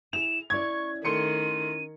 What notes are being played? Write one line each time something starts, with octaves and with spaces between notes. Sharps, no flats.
E4 G#4 E7 F7
C#4 E4 D5 C#6 G#6
D#3 A3 C6 C#7 D#7